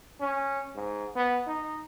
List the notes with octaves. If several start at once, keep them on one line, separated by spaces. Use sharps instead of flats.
C#4
G#2
B3
D#4